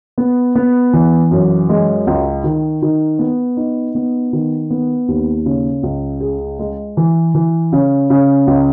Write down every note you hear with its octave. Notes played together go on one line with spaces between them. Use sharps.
B3
B3
E3
F#2
G#3
C#2
D#3
D#3
B3
D#4
B3
D#3
B3
D#2
C#3
C#2
G#4
G#3
E3
E3
C#3
C#3
C#2